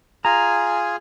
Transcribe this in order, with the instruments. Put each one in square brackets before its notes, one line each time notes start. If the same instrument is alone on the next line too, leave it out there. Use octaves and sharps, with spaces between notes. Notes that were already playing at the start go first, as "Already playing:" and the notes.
[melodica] F4 G#4 G#5 [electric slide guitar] A#5